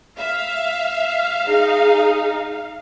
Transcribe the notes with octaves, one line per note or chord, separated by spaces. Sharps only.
E5 F5
D#4 G#4